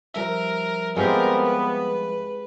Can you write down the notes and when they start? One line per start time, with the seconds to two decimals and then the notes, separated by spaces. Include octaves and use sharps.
0.14 F3 G3 A#4 E5
0.97 G#3 B3 C4 F4 G4 A#4
1.45 B4